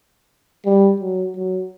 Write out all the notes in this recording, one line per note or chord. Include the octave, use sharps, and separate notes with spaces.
G3
F#3
F#3